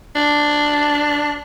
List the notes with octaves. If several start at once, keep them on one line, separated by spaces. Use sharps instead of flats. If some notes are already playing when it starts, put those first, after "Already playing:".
D4